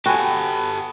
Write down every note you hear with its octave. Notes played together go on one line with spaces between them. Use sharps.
B3 F#4 G4 A4 G5 G#5